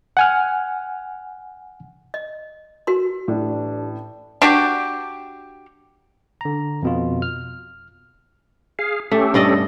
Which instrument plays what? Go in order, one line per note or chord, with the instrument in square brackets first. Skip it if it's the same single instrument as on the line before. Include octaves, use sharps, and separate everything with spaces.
[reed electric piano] F#5 G#5 F6
[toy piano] D#5
F#4 A#4 C6
[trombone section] A1 D4 [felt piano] A2
[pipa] D4 F#4 G4
[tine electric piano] D3 A#5
F2 B2 F4
F6
[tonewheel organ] G#4 F5
[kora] A3 [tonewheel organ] C#4 G4 A4
[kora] G2 D5 D#5